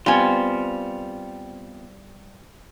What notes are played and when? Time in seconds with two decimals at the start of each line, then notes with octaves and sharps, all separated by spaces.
0.06 G3 B3 C4 F4 G#5